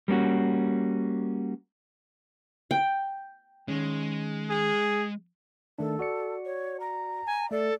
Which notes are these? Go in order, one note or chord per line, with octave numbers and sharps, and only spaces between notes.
G3 A#3 C#4 F#4
G5
D#3 G#3 C#4
G#4
D#3 A3 D4 A4
F#4 D5 C#7
C#5
A#5
G#5
A3 A4 D5